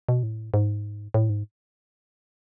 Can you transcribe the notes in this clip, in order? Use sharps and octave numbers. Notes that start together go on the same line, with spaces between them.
B2
A2
G#2
A2
G#2